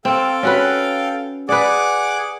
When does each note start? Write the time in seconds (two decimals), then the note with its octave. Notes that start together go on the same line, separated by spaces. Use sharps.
0.05 C4 A4 F5 G5
0.43 C#4 F#4 B4
1.49 G#4 B4 D5 F#5 D6